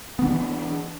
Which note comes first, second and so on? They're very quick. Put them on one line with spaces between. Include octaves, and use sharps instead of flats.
B3 D#3 D4 E3